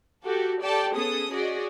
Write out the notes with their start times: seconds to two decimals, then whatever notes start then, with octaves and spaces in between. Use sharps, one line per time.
0.24 F#4 G4 A4
0.61 G4 A4 D5 G5 A5
0.96 B3 C#4 G#4 A4 D#6
1.31 C#4 F#4 G#4 D5 D#5